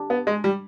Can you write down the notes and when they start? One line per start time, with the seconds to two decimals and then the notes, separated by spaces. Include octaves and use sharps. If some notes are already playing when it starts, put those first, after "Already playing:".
Already playing: D4 G4
0.10 B3
0.27 G#3
0.44 G3